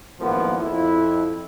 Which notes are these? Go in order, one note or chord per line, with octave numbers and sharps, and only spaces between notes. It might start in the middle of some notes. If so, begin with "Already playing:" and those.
G#1 F#2 A2 F3 A#3 B3
F2 E4